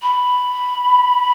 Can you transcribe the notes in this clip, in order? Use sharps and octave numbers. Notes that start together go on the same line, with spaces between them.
B5